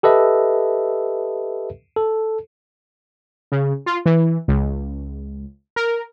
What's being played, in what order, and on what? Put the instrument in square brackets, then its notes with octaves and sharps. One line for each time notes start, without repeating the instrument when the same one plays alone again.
[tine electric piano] G4 A4 B4 D#5 E5
A4
[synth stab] C#3
F4
E3
C#2
A#4